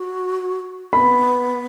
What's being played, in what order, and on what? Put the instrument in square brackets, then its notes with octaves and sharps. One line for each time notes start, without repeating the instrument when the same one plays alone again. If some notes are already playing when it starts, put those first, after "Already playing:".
Already playing: [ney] F#4
[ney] B3 [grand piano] B5